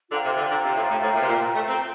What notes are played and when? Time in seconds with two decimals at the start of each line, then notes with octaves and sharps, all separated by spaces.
0.10 D3 F4 C5 G5 A#5
0.24 C3
0.36 D3
0.50 D3
0.63 C3
0.75 A2
0.89 A2
1.02 A2
1.15 A#2
1.22 C3
1.28 A#2
1.41 A#2
1.54 A3
1.67 C4